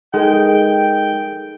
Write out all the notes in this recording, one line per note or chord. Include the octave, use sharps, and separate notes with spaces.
G#3 D#4 A4 A#4 G5